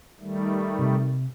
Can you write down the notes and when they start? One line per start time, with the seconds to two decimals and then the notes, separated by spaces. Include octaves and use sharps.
0.20 D#3 G3 A3
0.79 C3